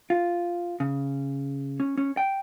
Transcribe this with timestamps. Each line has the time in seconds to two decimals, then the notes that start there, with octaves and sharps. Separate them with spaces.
0.10 F4
0.80 C#3
1.80 C#4
1.98 C#4
2.17 G5